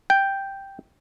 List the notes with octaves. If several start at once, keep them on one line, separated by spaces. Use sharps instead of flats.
G5